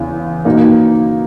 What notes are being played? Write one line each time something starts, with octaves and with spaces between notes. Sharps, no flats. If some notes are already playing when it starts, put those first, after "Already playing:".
Already playing: E2 C#3
B2 A#3 D#4